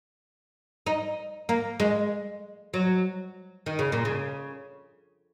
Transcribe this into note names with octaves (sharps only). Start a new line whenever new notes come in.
D#4
A#3
G#3
F#3
D#3
C#3
A#2
C#3